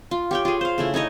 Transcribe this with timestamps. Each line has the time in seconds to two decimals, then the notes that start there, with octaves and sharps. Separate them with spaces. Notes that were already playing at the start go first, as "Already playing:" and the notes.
0.11 F4
0.31 G4 C#5 G5
0.45 F4 G#4
0.61 C5 F5
0.78 C#3 A3 E4
0.94 D#4 E4 C#5 D#5